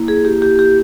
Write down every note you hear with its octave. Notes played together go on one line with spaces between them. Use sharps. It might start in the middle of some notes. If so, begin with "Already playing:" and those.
Already playing: A#3 E4
G#4
G4
G4
G4